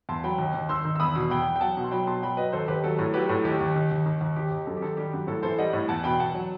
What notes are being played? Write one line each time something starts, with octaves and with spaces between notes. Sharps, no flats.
E2 A5 C6
F#3 G5 B5
D#2
D#2
D#3 C6 E6
D#3
E6
E2 B5 D#6
B2
E2 G5 B5
E2
G5
F#3 F#5 A5
B2
C6
F#3 G5 B5
B2 A5 C6
F#3 G5 B5
F#3 B4 D#5
D#2 A4 C5
D#2 G4 B4
F#3 A4
A2 A4
F#3 G4 B4
A2 A4
D#2 G4
D#2
D#3
D#2
D#3
D#2
D#3 G4
D#2
F#2 A4
G4
D#3 A4
G3 G4
F#2
A2 A4
E3 A4 C5
G3 D#5 F#5
A2
E2 F#5 A5
B2 G5 B5
E2 F#5 A5
F#3